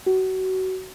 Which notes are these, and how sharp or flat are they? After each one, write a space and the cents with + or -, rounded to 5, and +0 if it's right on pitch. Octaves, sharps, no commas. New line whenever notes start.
F#4 +25